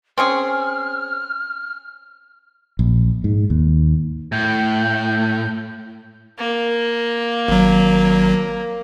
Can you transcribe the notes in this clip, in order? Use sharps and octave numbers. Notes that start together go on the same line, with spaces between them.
C4 C#4 G#4 F6
A#1
G#2
D#2
A2 G6
A#3
G#1 F#3